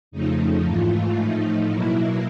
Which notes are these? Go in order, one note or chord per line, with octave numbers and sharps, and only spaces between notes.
F2 C#3 F3 A3 D#4
G#2 E3 A3 F4
A2 F3 A3 D#4
B2 F#3 A#3 E4